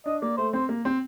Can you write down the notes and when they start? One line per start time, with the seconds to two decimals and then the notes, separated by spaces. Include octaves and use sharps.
0.06 D4 D#5
0.22 A#3 D5
0.38 A3 C5
0.53 C4 C5
0.69 A#3
0.85 C4